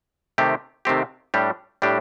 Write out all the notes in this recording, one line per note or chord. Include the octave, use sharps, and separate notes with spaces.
C3 D#3 A3 C4 G4
C3 D#3 A3 C4 G4
A2 G3 D4 G4
A2 G3 D4 G4